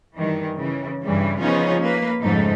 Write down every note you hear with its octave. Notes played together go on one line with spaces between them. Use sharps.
G2 D#3 E3
C#3 E3
G2 C#3 E3 G3
C#3 F3 B3 C#4 D#4 F4
A#3 B4
F2 G#2 C#3 A3 D#4